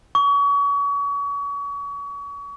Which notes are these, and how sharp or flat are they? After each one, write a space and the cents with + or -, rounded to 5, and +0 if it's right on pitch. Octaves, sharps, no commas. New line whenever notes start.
C#6 +35